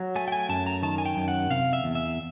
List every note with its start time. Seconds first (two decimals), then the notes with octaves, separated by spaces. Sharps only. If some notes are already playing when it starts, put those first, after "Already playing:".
Already playing: F#3
0.16 A3 G#5
0.28 G5
0.32 G#5
0.49 F#2 A5
0.66 A#5
0.83 D#3 A5
0.98 G#5
1.05 G5
1.17 F#2
1.28 F#5
1.50 C3 F5
1.73 E5
1.84 E2
1.95 E5